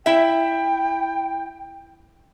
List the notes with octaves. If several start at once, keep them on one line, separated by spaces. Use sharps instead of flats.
E4 E5 G5